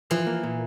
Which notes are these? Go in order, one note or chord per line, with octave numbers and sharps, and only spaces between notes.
E3 F3
A#3
A#2